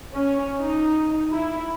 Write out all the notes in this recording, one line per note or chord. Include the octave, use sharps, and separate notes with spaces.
C#4
D#4
E4